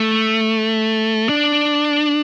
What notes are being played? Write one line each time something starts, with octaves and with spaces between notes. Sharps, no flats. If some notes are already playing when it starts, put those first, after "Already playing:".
Already playing: A3
D4